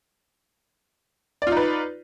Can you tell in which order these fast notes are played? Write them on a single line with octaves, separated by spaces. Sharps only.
D5 F4 D#4 B4